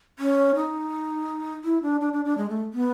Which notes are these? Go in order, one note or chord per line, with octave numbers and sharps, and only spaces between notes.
C#4
D#4
E4
D4
D4
D4
D4
G#3
A3
B3